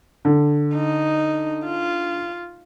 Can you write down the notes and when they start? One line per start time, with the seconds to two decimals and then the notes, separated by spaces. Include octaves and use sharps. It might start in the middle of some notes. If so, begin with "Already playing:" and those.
0.25 D3
0.75 D#4
1.64 F4